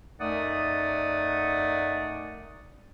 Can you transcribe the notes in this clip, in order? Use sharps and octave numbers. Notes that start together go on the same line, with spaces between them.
F#2 A3 D#4 D5 F#5 D#6